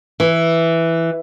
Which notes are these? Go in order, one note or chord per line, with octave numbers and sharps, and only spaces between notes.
E3